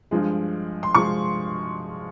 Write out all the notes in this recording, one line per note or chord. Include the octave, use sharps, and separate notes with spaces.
G2 F3 G#3
C6
F3 G#3 C#6